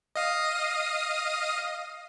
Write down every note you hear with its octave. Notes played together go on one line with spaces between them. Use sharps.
D#5 F5 D#6